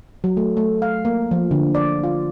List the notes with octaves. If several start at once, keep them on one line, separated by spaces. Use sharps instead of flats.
F#3
A3
A3
F5
A#3
F3
D3
D5
F4